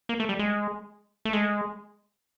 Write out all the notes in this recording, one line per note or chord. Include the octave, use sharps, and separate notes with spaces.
A#3
A3
G3
G#3
A3
G#3